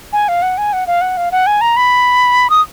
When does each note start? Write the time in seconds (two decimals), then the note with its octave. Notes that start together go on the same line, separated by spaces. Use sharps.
0.13 G#5
0.28 F5
0.42 F#5
0.58 G#5
0.73 F#5
0.87 F5
1.01 F#5
1.17 F5
1.32 F#5
1.47 G#5
1.61 A#5
1.77 B5
2.50 D#6